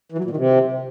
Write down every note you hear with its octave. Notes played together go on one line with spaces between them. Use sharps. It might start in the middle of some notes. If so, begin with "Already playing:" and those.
E3
F#3
A#2
D#3
C3